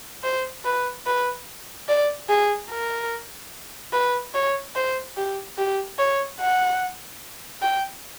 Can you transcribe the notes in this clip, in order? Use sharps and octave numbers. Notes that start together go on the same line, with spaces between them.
C5
B4
B4
D5
G#4
A#4
B4
C#5
C5
G4
G4
C#5
F#5
G5